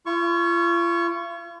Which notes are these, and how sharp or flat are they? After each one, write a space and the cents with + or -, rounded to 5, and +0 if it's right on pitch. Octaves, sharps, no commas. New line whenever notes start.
F4 -40 C#6 +0